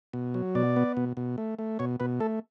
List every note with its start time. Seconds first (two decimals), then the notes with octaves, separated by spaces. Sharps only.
0.13 B2
0.34 F#3
0.55 B2 D5
0.76 B3
0.97 B2
1.17 B2
1.38 A3
1.59 A3
1.79 B2 C#5
2.00 B2 B4
2.20 A3 A4